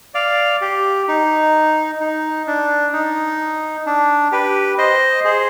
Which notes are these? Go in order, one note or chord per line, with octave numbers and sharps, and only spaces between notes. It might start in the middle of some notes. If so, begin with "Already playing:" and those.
D5 F5
G4
D#4
D#4
D4
D#4
D4
G4 B4
C5 D#5
G#4 C5